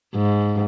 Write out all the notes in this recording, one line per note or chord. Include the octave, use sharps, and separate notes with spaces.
G#2